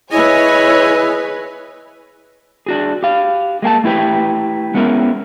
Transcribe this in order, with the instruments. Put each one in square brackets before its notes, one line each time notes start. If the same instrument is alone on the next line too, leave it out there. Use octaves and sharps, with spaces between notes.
[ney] E4 [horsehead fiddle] G#4 B4 [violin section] C#5 G#5 [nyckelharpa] D#5
[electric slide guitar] D4 F#4 G#4
G4 F5
G#3 A#3 G#5 A5
A3 E4 G4 B4
G#3 B3 C#4 E4 A#4